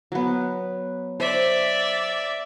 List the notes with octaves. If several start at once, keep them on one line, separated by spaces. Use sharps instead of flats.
F#3 B3
C5 D5 E5